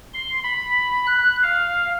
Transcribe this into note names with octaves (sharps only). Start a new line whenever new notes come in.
C6
B5
F#6
F5